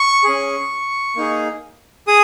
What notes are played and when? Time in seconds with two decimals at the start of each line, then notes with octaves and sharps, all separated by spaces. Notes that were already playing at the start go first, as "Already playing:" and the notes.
Already playing: C#6
0.24 C#4 G#4
1.16 A#3 D#4 G#4
2.07 G#4 D#6